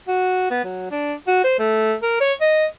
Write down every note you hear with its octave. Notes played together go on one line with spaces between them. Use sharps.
F#4
B3
F#3
D4
F#4
C5
A3
A#4
C#5
D#5